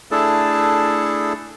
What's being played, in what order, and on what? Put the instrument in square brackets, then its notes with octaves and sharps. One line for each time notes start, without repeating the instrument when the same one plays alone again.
[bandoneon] A3 D4 E4 G#4 A4 A5